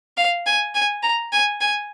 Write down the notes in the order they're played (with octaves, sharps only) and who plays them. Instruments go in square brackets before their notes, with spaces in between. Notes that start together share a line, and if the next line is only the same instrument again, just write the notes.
[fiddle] F5
G#5
G#5
A#5
G#5
G#5